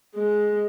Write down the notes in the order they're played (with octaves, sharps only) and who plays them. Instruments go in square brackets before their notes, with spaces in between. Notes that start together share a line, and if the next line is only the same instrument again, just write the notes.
[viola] G#3